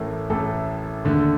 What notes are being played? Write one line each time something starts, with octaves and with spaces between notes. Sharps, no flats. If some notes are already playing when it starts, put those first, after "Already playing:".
Already playing: A1 A2 A3 A#4
A1 A2 A3 A4
D#2 D3 A3